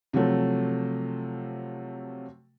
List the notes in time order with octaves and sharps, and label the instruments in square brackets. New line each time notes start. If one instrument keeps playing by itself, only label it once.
[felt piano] C3 F3 F#3 A3